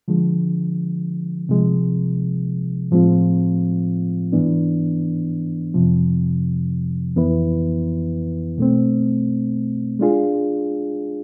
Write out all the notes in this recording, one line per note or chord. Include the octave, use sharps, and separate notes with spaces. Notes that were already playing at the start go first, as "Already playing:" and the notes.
D3 F3 G#3
C3 F3 G#3
A2 F3 G#3 C4 F4
G#2 E3 B3 D4
F2 C3 F3
F2 E3 B3 E4 B4
B2 A3 C4
G#3 D4 F4 G#4